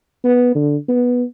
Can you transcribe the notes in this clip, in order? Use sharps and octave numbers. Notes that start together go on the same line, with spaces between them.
B3
D3
B3